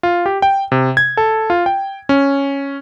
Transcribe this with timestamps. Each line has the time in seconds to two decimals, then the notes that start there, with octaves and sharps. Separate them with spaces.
0.03 F4
0.26 G4
0.42 G5
0.72 C3
0.97 G#6
1.17 A4
1.50 F4
1.66 G5
2.09 C#4